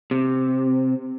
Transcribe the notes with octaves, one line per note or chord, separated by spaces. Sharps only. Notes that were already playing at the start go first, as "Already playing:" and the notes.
C3